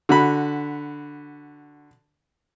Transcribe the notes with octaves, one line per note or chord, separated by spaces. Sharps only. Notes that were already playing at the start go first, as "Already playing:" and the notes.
D3 F#4 B5